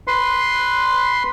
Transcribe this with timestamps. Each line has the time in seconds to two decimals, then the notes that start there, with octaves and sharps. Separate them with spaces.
0.07 B4 C6